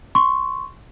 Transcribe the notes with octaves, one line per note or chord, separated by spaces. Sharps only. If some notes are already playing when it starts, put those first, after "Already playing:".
C6 C#6